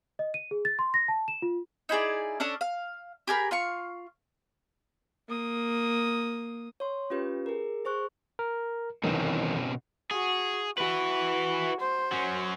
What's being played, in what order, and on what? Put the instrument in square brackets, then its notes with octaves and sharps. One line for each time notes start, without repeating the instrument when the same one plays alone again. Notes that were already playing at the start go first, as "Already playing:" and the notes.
[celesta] D#5
D#7
G#4
A6
C6
A#6
A5
E7
F4
[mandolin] D#4 E4 G#4 D5
C#4 D4 A4 D#6
F5
G4 G#4 A#4 B5
F4 F5 C#6
[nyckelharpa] A#3 D#6
[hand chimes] C#5 C6
C#4 F4 G4 B4
G#4 A#4
G#4 C5 C#6 F#6
[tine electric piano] A#4
[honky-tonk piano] C2 F2 [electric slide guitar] B2 C4 C#4 [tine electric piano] D#3 E3
[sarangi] F#4 [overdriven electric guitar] G#4
[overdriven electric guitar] E4 B4 [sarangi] F#4
[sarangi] C5
[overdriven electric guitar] F#3 C#4